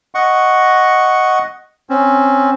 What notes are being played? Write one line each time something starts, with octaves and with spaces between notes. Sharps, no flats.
D#5 F#5 C#6
C4 C#4